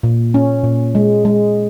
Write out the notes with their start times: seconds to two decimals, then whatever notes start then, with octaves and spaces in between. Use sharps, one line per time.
0.03 A#2
0.34 C#4
0.64 A#2
0.95 G#3
1.25 G#3